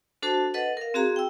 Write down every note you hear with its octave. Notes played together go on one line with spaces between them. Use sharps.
D4 F#4 A4 C5 A5
A4 B4 D#5 F#5
A#4 F5
C4 F#4 G#4 F5 A#5
G5 E6